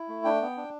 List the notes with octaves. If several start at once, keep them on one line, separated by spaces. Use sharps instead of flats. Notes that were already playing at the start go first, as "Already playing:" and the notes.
Already playing: E4
A3
D4 G5
B3
D4